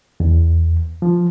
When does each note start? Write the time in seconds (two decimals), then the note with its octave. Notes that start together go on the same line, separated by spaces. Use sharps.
0.20 E2
1.02 F3